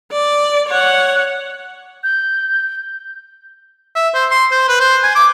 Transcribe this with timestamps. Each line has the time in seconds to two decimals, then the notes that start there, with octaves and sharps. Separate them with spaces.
0.12 D5
0.68 C#5 F#5
2.04 G6
3.95 E5
4.14 C5
4.31 C6
4.51 C5
4.68 B4
4.80 C5
5.03 G#5
5.15 D6